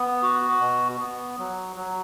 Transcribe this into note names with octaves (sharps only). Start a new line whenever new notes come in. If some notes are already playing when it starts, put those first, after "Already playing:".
Already playing: B3
F#4
B2
B3
F#3
F#3